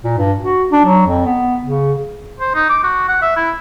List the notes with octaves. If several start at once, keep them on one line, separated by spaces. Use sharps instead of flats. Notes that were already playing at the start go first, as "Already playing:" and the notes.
A#2
G2
F#4
D4
F#3
F2
B3
C#3
C5
D#4
D6
F#4
F#5
E5
E4